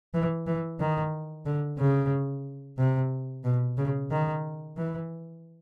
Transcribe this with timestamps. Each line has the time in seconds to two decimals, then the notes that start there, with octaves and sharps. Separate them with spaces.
0.14 E3
0.47 E3
0.80 D#3
1.46 D3
1.79 C#3
2.78 C3
3.44 B2
3.77 C#3
4.11 D#3
4.77 E3